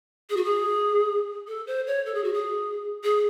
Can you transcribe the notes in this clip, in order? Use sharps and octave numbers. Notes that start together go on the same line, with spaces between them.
G#4
F#4
G#4
A4
C5
C#5
A4
G#4
F#4
G#4
G#4